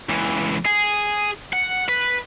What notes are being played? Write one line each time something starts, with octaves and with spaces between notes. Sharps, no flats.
C#2 E3
G#4
F#5
B4